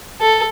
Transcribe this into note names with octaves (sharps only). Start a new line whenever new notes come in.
A4